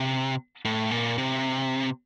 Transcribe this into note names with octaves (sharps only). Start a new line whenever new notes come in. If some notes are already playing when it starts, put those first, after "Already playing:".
Already playing: C3
A2
A#2
C3